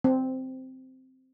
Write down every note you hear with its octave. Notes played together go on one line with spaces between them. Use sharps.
C4